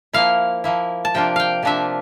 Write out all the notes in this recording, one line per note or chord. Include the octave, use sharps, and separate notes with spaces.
F3 A#3 E4 F5
F3 A#3 E4
A5
C3 F3 A#3 D4 F4 G5
F5 G5
C3 F3 A#3 D4 F4 E5